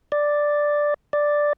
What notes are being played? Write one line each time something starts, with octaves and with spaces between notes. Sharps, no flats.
D5
D5